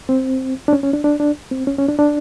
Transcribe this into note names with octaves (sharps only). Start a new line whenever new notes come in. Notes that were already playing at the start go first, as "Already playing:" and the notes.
C4
D4
C#4
C#4
D4
D4
D4
C4
C#4
C#4
D4
D4